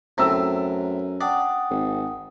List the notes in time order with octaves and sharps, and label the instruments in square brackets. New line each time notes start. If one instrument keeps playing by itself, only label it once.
[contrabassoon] F#2 [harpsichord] A2 C4 [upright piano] A#5 E6
[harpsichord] D4 D5 [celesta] F#5 G5 D#6
[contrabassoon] G#1